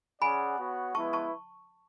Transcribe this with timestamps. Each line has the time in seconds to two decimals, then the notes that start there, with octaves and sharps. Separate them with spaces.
0.22 C#4 G#4 D5 F#5 G#5 B5
0.59 B3 F#4 C#5 F#5
0.95 G#3 B3 E4 B4 A5 C#6
1.13 A5 C#6